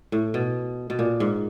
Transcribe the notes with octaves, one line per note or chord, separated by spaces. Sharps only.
A2
B2
B2
A#2
G#2